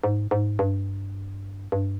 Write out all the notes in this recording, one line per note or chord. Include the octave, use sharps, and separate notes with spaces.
G#2
G#2
G2
G2